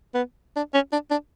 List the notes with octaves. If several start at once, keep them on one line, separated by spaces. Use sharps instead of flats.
B3
D4
C#4
D4
D4